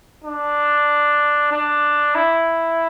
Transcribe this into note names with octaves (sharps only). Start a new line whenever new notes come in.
D4
D4
E4